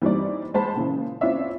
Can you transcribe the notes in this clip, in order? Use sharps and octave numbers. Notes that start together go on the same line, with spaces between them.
E3 G3 C4 D4 D#4 D5
G#3 C5 A5 B5
A#2 C#3 E3
C4 C#4 E4 F4 D5 E5